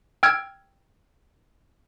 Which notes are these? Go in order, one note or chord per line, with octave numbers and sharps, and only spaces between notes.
G5 E6 F6 G#6